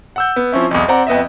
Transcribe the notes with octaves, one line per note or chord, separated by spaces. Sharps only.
F#5 E6 G6
B3
F3 C4 C#4 E4
B1 E2
C4 D5 F#5 A#5
F2 B3 D#5 E5